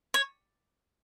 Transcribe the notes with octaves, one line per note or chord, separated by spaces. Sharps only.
C#5